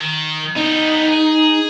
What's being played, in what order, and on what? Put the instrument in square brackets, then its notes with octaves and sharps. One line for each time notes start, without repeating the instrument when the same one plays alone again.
[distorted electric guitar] D#3
[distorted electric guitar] G3 B3 [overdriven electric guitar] D#4
[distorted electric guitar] G#4